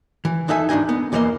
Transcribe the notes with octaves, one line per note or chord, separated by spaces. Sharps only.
E3
E2 E3 D#4 A4 E5 G#5
E2 G#2 D4 D#4 G#5
B3
B1 E2 E3 A#3 C5 D#5